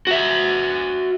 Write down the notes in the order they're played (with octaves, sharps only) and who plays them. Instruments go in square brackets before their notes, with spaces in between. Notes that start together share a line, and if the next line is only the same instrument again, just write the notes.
[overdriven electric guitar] F#4 E5